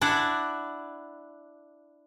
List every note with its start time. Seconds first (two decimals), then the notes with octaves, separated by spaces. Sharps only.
0.01 D4 E4 D5 F#5